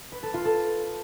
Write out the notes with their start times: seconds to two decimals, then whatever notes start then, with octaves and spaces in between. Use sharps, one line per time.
0.12 B4
0.23 A4
0.34 F4
0.45 A4